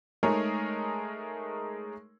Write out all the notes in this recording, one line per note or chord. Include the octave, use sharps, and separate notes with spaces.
G#3 A3 D#4 G#4 A#4 C#5